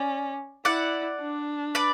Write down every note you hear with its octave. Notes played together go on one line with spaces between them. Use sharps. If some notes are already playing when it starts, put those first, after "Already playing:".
Already playing: C#4 D5
E4 D5 F#5
D4
B4 D5